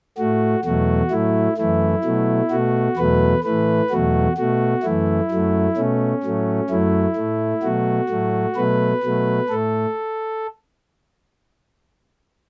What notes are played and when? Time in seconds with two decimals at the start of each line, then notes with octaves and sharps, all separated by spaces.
0.18 A2 A3 F#4
0.65 E2 B2 F#3 A3 F#4
1.11 A2 F#3 A3 E4
1.58 F#2 E3 A3 E4
2.04 B2 F#3 A3
2.51 B2 A3 F#4
2.97 E2 B2 F#3 A3 B4
3.44 A2 E3 A3 B4
3.90 E2 B2 F#3 A3 F#4
4.37 B2 A3 F#4
4.83 F#2 E3 A3 E4
5.31 F#2 F#3 A3
5.76 B2 A3 C#4
6.23 A2 F#3 A3
6.69 F#2 F#3 A3 E4
7.16 A2 A3
7.63 B2 F#3 A3 F#4
8.09 A2 F#3 A3
8.56 B2 F#3 A3 B4
9.03 B2 F#3 A3
9.49 A2 A3 A4